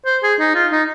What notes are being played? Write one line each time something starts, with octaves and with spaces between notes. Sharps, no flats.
C5
G#4
D#4
F4
D#4